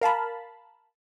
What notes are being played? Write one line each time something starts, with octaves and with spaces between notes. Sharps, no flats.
A#4 F5 A5 B5